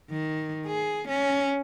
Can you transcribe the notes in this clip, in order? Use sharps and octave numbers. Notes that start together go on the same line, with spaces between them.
D#3
G#4
C#4